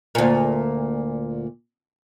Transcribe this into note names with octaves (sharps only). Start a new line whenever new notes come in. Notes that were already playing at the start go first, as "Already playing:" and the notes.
D2 A#2